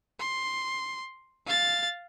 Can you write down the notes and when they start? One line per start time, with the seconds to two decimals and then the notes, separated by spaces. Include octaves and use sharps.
0.19 C6
1.46 F5 A6